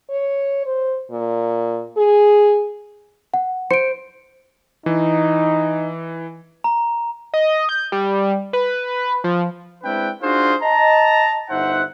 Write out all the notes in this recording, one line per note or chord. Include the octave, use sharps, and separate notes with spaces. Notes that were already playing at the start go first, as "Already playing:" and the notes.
C#5
C5
A#2
G#4
F#5
C5 C#7 D7
E3 D#4
A#5
D#5
G6
G3
B4
F3
G#3 C4 D4 E4 B4 G5
D4 D#4 F4 F#4 G#4 C5
D#5 A5 A#5
G1 D#4 C5 E5 F#5